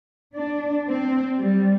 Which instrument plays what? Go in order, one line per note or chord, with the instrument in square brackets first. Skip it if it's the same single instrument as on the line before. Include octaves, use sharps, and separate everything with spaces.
[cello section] D4
C4
G3